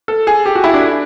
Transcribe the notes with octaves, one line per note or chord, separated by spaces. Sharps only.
A4
G#4
G4
F#4
E4
D4